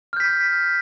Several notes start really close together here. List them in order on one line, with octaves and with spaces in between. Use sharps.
F6 G6 B6